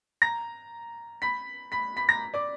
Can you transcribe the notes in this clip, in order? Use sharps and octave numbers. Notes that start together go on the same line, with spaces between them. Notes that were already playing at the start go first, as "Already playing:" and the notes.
A#5 A#6
B5 B6
B5 B6
B5 B6
A#5 A#6
D5 D6